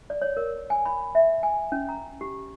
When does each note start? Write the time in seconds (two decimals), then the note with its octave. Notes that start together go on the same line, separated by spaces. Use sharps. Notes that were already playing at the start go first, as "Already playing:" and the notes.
0.10 D5
0.22 C#5
0.37 A#4
0.70 G#5
0.85 B5
1.15 E5
1.43 G#5
1.72 C#4
1.89 A#5
2.21 G4